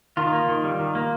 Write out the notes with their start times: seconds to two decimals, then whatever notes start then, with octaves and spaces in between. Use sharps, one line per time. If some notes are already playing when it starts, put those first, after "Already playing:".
0.17 D#3 F4
0.33 A#3
0.48 D#3
0.64 G3
0.79 D#3
0.95 A#3